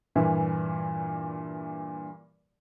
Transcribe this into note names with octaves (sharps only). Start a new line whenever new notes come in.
G2 A#2 E3 E4